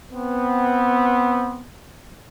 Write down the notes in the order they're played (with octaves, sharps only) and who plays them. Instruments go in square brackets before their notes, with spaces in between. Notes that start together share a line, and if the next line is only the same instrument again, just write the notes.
[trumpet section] B3 C4